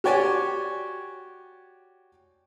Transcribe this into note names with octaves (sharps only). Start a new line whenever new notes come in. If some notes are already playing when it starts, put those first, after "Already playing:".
F#4 G4 C#5 D5 G#5